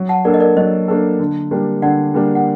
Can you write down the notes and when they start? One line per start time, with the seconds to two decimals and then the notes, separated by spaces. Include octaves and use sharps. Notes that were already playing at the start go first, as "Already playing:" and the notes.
Already playing: F#3
0.09 F#5 A5
0.25 A#3 D4 A4 A#4 D5
0.34 D#5
0.40 A#4 D5
0.57 F#3 C5 D#5
0.88 A#3 D4 A4
1.20 D3
1.51 G3 A#3 D4
1.82 D3 D5 F#5
2.14 G3 A#3 D4
2.35 F#5